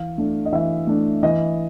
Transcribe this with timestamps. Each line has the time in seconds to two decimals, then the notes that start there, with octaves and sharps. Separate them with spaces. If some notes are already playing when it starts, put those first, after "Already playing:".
Already playing: E3 F5
0.18 A3 D4
0.45 D#5
0.52 E3 E5
0.87 A3 D4
1.23 E3 D#5